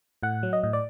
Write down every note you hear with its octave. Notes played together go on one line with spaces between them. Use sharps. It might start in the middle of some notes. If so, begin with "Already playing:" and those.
A2 F#5
F#3
D#5
A2 D#5
D5